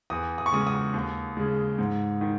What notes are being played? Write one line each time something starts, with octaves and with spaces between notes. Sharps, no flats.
E2 D#6
D#6
C#6
C#3 G#3 D#6
D#6
D#2
C#3 G#3
G#2
D#3